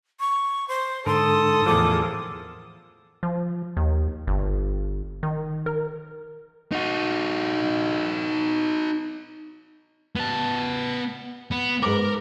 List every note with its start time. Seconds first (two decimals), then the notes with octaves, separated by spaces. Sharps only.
0.20 C#6
0.68 C5
1.06 G#2 D3 A4 A#4 C6 D#6
1.66 E2 A2 F3 G#4 A#4 D6
3.23 F3
3.77 D#2
4.27 G1
5.23 D#3
5.66 A#4
6.72 D#4 F#4
10.16 B3 A5
11.51 B3
11.83 G#2 A#4 B4 D6